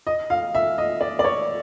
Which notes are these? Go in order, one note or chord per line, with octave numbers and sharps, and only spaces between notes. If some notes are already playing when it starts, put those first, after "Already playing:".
D#5
F5
E5
D#5
D5
D5
C#5